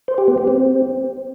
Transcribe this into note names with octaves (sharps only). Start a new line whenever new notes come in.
C5
G4
B3
G4
C4